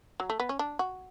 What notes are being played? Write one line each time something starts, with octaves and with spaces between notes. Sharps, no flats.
F#3
A3
B3
C#4
D4
F#4